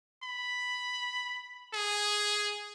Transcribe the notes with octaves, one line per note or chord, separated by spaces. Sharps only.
B5
G#4